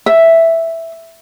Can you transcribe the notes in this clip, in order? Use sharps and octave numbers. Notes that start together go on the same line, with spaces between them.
E5